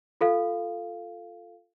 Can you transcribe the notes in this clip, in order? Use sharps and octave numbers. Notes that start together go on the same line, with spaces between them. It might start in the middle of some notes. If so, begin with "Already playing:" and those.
F4 A4 F5